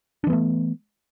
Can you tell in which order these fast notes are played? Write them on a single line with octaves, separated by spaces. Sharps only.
D4 E3 B3 A3